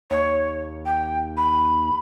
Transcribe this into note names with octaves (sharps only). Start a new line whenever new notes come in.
D#2 C#5
G5
B5